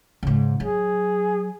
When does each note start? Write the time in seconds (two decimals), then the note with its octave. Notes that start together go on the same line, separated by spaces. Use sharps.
0.23 G#2 C#3
0.60 F#3 G#4